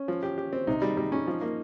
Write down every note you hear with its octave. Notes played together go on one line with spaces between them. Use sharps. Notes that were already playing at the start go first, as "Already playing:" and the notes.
Already playing: C#4
F3
G4
G4
C4
C3 D#4
G3
G3
C#4
F3
A#3